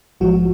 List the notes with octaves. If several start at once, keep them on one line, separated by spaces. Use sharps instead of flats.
A#1 G#2 F3 G#3 F#4